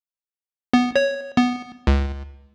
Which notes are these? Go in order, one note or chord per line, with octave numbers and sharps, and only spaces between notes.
B3
C#5
B3
C#2